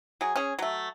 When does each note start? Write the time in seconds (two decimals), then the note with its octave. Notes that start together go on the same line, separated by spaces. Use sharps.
0.21 F#3 G#4
0.36 C#4 G#4
0.59 F#3 A3